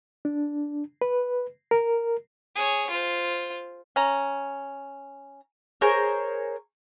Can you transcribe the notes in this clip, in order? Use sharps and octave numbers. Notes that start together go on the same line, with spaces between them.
D4
B4
A#4
G#4 C#5
F4 C5
C#4 A#5
G#4 A#4 C5 C#5